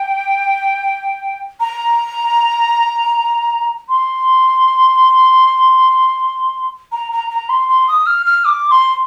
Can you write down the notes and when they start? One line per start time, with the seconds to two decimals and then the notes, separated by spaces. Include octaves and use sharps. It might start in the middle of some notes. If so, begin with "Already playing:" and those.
Already playing: G5
1.60 A#5
3.89 C6
6.92 A#5
7.12 A#5
7.30 A#5
7.49 C6
7.69 C6
7.88 D#6
8.06 F6
8.26 F6
8.45 D6
8.70 C6